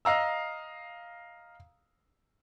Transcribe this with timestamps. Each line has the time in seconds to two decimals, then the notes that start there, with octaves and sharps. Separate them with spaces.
0.05 D#5 F5 A#5 E6